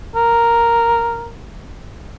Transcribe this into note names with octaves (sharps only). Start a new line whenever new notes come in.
A#4